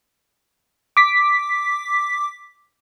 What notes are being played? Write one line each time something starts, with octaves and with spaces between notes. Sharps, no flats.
D6 B6